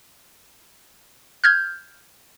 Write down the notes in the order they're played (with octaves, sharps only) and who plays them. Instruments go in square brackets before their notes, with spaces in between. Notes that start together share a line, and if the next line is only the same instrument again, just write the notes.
[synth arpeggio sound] F6 G6 G#6